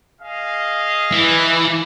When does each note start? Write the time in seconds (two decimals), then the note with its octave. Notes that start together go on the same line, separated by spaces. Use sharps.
0.21 G#4 D#5 F5
1.12 E3